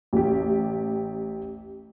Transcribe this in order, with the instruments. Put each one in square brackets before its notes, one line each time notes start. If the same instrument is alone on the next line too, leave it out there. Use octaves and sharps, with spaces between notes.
[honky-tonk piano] A1 G4